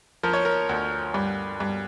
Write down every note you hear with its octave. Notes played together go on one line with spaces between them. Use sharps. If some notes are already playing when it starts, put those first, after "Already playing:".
F3 A#4
C#5
A#4
D2
G2
G2